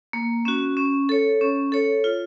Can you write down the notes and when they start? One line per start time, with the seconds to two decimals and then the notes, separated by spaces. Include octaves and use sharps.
0.13 A#3
0.45 C#4 F#4
0.77 C#4
1.09 A4 C#5
1.41 C#4
1.72 A4 C#5
2.04 F4